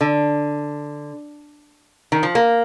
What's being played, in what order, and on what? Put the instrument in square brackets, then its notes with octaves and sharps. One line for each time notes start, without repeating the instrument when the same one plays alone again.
[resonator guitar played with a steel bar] D3
D#3
F3
A#3